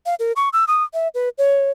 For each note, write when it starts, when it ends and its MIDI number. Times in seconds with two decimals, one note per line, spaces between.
0.06 0.15 77
0.20 0.32 70
0.36 0.49 85
0.53 0.65 88
0.68 0.83 87
0.94 1.08 76
1.14 1.29 71
1.38 1.71 73